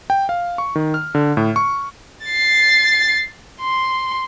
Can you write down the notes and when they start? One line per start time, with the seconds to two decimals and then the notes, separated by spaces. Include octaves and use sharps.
0.10 G5
0.29 F5
0.58 C#6
0.76 D#3
0.94 F6
1.15 D3
1.37 A2
1.56 C#6
2.26 A6 C7
3.61 C6